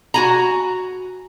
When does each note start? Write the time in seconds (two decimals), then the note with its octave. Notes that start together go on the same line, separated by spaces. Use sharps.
0.14 F#4 G#5 A#5